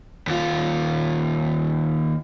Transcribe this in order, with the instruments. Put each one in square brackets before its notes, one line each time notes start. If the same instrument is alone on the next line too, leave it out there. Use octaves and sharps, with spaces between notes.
[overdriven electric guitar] D#2 F4